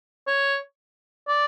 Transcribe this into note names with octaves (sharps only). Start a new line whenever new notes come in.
C#5
D5